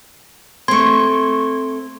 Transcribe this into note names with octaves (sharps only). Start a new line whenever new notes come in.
A3 C4 C6 C#6 G#6